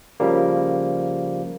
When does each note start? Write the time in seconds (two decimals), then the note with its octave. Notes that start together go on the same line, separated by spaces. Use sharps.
0.20 C#3 F3 G3 A#3